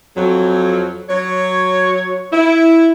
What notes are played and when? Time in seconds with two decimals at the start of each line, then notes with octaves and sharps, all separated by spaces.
0.16 F2 F#3
1.09 F#3 C#5
2.32 E4